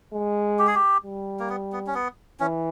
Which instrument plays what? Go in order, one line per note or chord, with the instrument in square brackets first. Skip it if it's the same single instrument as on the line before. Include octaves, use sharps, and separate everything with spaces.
[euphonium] G#3
[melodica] G4
G#4
G4
[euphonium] G3
[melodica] A#3
B3
B3
C#4
B3
[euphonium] E3 [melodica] C#4